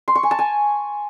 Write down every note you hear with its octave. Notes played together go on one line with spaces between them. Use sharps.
C6
C#6
G#5
A5
G#5